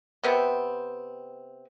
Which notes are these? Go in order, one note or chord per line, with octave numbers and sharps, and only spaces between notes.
C3 B3 C4